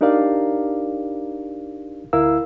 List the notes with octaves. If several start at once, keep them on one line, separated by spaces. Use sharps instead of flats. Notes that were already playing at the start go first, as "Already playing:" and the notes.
D4 D#4 G4 A#4 D5 F5
D2 E4 A#4 F5 E6